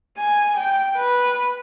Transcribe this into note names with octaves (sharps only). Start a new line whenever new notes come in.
G#5
G5
B4